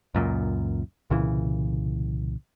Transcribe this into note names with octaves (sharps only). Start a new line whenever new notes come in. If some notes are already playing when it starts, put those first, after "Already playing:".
C#2 F#2 A#2
C2 A#2 C#3 E3